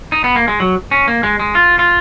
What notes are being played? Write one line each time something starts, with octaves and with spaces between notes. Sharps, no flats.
D#4
B3
A#3
G#3
F#3
C#4
A#3
G#3
G#3
F4
F4